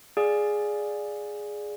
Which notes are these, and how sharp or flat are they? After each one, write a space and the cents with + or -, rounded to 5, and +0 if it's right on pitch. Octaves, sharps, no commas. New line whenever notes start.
G#4 +0 D5 +0 F5 +0